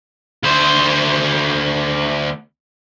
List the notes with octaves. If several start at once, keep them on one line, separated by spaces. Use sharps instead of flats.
D2 C5